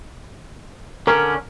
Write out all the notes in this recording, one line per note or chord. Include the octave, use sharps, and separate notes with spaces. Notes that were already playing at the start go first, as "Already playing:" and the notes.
D3 C#4 A#4